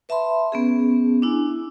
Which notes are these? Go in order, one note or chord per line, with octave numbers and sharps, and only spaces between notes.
B4 E5 A5 B5 C6
B3 C#4 G#4
D4 E4 G#5